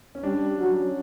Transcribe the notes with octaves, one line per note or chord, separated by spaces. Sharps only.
C#4
G3 D4
F#3 C#4